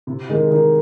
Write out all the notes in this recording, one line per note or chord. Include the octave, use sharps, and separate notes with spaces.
C3
D#3 G#3
D#3